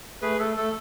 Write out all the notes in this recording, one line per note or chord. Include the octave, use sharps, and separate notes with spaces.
A3 G#4 B4
A3 A4
A3 A4